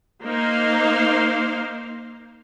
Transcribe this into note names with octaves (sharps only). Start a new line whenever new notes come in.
A#3 D#4 C5 F5